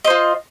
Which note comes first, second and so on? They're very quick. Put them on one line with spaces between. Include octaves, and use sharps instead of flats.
D#5 C5 F4